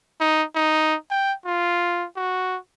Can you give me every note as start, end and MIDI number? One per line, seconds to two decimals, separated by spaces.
0.20 0.43 63
0.55 0.95 63
1.11 1.33 79
1.45 2.05 65
2.17 2.57 66